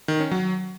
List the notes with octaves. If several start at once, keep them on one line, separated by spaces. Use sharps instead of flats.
D#3
C#4
F#3